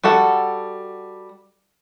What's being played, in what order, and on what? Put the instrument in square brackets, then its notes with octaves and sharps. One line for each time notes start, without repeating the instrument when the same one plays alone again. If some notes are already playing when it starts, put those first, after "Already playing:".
[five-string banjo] G3 F#4 A4 F#5